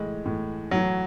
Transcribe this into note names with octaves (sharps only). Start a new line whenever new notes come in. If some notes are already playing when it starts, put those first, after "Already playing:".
Already playing: A2 E3 G#3
A2 E3
A2 E3 F#3